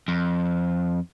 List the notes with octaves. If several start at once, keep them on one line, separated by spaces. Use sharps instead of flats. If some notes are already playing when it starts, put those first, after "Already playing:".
F2